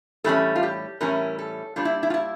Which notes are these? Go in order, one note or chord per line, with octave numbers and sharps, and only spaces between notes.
A2 E3 G3 C#4 A4
F4
G4
A2 E3 G3 C#4 A#4
A4
A#2 G3 D4 F4
E4
E4
F4
E4